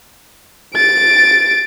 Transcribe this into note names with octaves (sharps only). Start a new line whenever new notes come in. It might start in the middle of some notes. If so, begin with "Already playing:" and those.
A6 D7